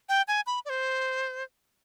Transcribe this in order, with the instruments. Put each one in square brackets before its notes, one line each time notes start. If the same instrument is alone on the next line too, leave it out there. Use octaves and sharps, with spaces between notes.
[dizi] G5
G#5
B5
D5
C5